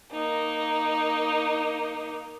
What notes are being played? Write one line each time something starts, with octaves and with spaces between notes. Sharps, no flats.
A#3 D#4